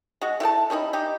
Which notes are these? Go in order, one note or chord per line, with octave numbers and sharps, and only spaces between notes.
G#3 F#4
E4 A4 F#5 A5
G3 C#4 D#4 E4
D#4 G4